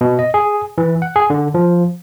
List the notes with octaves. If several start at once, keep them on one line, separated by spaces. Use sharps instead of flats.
B2
D#5
G#4
E3
F#5
G#4
D3
F3